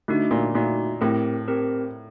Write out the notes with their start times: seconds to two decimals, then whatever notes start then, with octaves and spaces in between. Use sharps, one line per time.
0.08 D3 A3 D#4 F#4
0.31 A#2
0.55 A#2 A3 D#4 F#4
1.01 A2 C4 G4 A#4
1.48 C4 G4 A#4